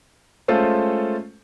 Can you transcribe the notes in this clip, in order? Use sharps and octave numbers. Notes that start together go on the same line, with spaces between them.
G#3 A3 C#4 F4 A4 C5